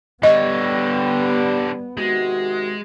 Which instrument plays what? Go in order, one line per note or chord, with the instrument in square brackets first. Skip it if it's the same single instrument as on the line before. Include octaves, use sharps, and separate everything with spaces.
[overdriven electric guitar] D3 C#5 [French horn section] G3 [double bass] B3 [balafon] D#5
[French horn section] C3 D#3 F#4 [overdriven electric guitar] G#3